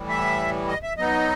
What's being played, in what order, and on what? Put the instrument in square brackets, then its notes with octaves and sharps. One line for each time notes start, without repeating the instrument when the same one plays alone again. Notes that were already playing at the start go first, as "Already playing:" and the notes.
Already playing: [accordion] A2 E3 G3
E5
D#5
E5
F#3 B3 D#4 D#5